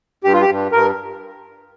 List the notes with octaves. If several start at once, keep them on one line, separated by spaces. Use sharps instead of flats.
G2 G4
F4
G4
G2
G2 A#4